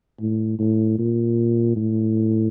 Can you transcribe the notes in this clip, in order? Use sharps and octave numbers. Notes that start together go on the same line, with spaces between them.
A2
A2
A#2
A2